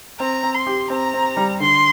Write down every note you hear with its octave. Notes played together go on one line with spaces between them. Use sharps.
C4 A#5
C4
C6
G4
C4 A#5
C4
G3
D3 C6